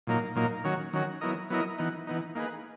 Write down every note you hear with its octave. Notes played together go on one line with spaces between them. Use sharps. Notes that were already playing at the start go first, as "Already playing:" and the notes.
A#2 F#3 A#3 D#4 A#4
A#2 F#3 A#3 D#4 A#4
D#3 F#3 C#4 F#4
D#3 F#3 C#4 F#4
F#3 B3 E4 A#4 D#5
F#3 B3 E4 A#4 D#5
E3 B3 D#4
E3 B3 D#4
A#3 D#4 G#4 B4